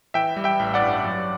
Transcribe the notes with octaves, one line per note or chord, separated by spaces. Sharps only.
E3 E5 G5
G3
E5 G5
A1
D5 F#5
G2
F#3